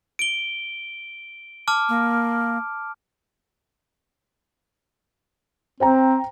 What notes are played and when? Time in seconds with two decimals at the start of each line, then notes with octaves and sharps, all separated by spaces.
0.19 D7 G7
1.68 A5 D6 F6
1.89 A#3
5.80 C4 C5 G5 A#5